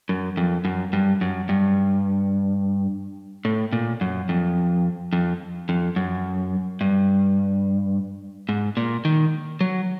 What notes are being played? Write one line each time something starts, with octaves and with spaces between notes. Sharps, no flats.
F#2
F2
F#2
G2
F#2
G2
A2
A#2
F#2
F2
F2
F2
F#2
G2
G#2
A#2
D#3
F#3